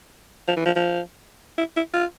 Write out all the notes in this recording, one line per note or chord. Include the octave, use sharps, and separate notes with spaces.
F3
E3
F3
F3
E4
E4
F4